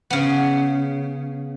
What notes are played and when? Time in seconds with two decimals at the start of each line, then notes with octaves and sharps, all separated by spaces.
0.10 C#3 B3